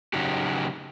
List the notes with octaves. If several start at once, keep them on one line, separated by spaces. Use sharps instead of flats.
C#3 F#3 D#4 F#4 G4